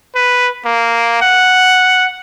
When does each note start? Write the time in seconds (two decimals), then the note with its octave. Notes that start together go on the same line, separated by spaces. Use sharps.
0.15 B4
0.65 A#3
1.21 F#5